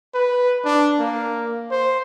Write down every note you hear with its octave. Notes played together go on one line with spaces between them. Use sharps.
B4
D4
A#3
C5